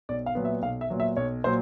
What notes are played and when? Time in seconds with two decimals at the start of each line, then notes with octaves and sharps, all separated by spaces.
0.09 B1 D5
0.26 F5
0.35 A#2 F#3 B3
0.45 E5
0.62 B1 F5
0.81 E5
0.90 A#2 F#3 B3
1.00 E5
1.17 B1 C#5
1.44 A#2 F#3 C5